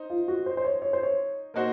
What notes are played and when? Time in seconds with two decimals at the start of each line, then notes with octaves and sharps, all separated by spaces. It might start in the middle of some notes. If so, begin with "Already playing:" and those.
Already playing: D#4 C5
0.10 F4
0.28 F#4
0.46 C5
0.57 C5
0.64 C#5
0.82 C#5
0.93 C5
1.03 C#5
1.54 A#3 D#4 F#4 C5